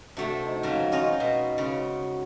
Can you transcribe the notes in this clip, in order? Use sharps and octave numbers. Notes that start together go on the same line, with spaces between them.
C3 A3 D4 F#4 A5
D#4 C5
G#2 C#3 F3
C#4 D#4 F4 F#4 D#5
B2
C#3 B5 C6 D6